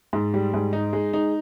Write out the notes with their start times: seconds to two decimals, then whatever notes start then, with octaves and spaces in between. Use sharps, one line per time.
0.13 G#2
0.34 G3
0.54 G#2
0.73 D#4
0.93 G#3
1.13 D#4